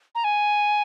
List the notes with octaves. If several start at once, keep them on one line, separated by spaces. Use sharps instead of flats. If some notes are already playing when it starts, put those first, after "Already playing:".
A#5
G#5